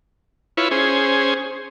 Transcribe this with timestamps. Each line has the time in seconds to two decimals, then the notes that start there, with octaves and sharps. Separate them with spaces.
0.57 E4 F4 B4 C#5
0.71 C#4 G#4 C5